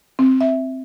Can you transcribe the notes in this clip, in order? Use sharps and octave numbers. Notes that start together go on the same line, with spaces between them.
C4
E5